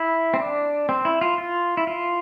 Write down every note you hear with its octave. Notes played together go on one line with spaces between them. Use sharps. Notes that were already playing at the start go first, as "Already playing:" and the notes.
Already playing: E4
C4
D4
C4
E4
F4
F4
E4
F4